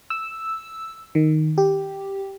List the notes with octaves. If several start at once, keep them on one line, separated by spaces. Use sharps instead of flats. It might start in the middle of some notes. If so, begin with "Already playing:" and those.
E6
D#3
G4